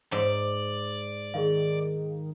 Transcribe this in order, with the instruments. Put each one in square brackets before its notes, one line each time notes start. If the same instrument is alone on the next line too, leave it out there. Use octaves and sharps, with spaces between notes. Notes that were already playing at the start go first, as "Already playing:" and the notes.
[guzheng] G#2 [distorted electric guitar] D5
[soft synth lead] D#3 [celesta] G#4 A#4 F5